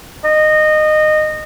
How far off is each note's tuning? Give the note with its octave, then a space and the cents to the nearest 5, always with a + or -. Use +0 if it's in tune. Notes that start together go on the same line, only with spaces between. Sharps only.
D#5 -20